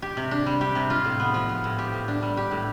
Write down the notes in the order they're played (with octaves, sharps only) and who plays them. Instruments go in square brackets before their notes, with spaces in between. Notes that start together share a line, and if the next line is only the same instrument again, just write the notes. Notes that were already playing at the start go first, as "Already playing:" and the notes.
[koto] G4
C3
D4
G3
G4
C3
F4
A2
B3
F3
F4
A2
G4
A2
D4
G3
G4
A2